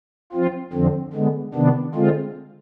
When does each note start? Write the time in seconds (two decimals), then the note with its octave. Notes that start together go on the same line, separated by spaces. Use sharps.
0.32 F3 C4 F4
0.73 F2 D3 F3 C4
1.13 D3 G#3 B3
1.54 C3 D#3 B3 D4
1.95 D3 G#3 C4 F4